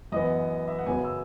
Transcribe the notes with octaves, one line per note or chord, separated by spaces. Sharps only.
F#2 E3 B3 D#5
E5
F#5
F#2 C#3 F#3 B3 G#5
E6